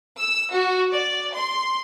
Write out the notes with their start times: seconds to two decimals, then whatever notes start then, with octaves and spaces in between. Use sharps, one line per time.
0.18 E6
0.52 F#4
0.92 D5
1.34 C6